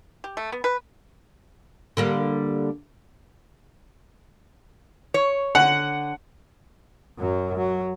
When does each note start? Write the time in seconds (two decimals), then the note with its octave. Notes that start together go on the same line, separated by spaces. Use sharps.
0.24 G4
0.37 A3
0.52 B3
0.64 B4
1.97 D3 G3 A#3
5.14 C#5
5.55 D3 F#5
7.19 F#2 F#3
7.57 F#3